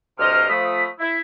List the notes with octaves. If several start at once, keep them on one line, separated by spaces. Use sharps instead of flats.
D2 G2 C3 C5 D#5 F6
F3 A3 B5 D#6
E4